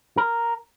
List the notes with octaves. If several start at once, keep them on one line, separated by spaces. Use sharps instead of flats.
A#4